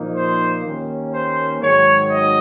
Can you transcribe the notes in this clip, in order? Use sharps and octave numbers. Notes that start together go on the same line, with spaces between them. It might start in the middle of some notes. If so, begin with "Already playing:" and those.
Already playing: A#2 F3 A#3 D#4
C5
D#2 D#3 A#3 C#4
C5
G#2 D#3 F#3 C#5
D#5